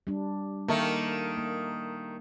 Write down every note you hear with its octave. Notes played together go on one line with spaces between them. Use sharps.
G3 D4
D#3 A3 A#3
A#3